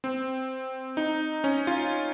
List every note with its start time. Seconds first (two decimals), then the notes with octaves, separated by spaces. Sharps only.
0.04 C4
0.97 D#4
1.44 C#4
1.67 F4